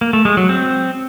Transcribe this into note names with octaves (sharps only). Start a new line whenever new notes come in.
A#3
A3
G#3
F#3
C4